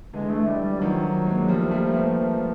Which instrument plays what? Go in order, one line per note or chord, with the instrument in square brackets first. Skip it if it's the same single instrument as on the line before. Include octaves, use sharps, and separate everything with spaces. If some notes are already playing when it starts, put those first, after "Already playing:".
[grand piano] D3 E3 [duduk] G#3
[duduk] A3
G3
G3
[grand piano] D#3 F3 [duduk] F#3
[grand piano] G#3 A#3
[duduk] F3 [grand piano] G3 A3
[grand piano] A#3
G3 A3
A#3
A3 B3